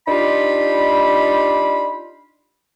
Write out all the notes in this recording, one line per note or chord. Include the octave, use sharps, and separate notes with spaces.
D4 D#4 F4 G4 B5